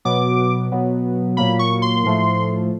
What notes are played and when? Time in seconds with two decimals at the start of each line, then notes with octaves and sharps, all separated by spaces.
0.05 B2 F#3 B3 D6
0.72 B2 F#3 B3
1.37 A#2 F#3 A#3 B5
1.59 C#6
1.82 C6
2.04 A2 F3 A3